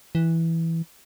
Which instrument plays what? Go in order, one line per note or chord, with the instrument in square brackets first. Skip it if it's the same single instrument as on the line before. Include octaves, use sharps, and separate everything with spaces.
[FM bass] E3